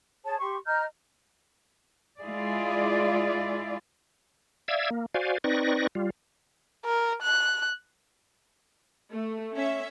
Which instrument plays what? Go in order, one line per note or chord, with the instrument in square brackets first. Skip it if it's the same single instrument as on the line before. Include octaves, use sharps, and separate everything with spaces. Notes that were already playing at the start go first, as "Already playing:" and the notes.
[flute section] G#4 C#5 A5
G4 C6 C#6
D#5 A#5 F6 G6
[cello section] G#3 E4 F4 G#4 D5
[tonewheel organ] D5 E5 F5 E6 G#6
A#3
F#4 C5 D5 F5 G#5
C4 D#4 B4 D5 C#6 A#6
G3 F4
[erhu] A#4
F#6
[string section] A3
C#4 E5